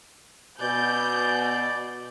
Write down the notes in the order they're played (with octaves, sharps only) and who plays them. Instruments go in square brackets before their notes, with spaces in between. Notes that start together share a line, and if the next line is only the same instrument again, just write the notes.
[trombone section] B2 [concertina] D5 [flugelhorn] G#5 [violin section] G6